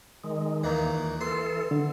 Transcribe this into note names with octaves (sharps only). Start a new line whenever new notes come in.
D#3 G#3
D#2 A#2 D#3 E3
E3 A4 C6
D3